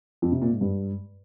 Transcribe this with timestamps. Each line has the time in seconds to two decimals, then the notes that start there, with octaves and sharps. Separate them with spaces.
0.22 F2
0.32 C3
0.42 A#2
0.51 G#2
0.61 G2